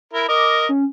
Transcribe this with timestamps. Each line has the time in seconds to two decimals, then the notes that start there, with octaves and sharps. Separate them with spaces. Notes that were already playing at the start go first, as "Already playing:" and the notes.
0.13 E4 A#4
0.29 A#4 D#5 D6
0.69 C#4